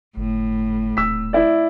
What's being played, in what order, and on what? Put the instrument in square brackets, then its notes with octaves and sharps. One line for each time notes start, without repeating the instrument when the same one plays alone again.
[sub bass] G1 [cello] A2
[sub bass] D#1 [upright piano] E6 B6
[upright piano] E4 D5